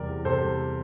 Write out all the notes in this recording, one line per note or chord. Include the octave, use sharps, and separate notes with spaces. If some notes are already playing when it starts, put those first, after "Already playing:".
Already playing: E2 C3 G3 A#4 D5
E3
C3 A4 C5
G3